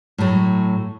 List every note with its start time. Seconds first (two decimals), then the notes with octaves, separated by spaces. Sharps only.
0.18 A2 F#3 A3